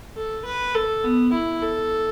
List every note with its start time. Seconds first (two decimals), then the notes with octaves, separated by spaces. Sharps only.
0.16 A4
0.45 B4
0.75 A4
1.04 B3
1.33 E4
1.62 A4